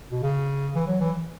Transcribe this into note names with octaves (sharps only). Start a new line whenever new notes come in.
B2
C#3
E3
F#3
E3